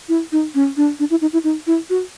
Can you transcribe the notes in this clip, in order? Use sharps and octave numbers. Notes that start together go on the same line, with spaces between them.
E4
D#4
C#4
D4
D4
E4
D#4
E4
D#4
E4
F#4